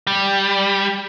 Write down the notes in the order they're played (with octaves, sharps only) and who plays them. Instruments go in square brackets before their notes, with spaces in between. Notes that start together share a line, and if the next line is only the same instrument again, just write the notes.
[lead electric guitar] G3